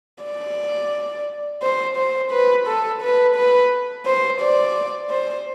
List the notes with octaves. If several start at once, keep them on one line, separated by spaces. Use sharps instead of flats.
D5
C5
C5
B4
A4
B4
B4
C5
D5
C5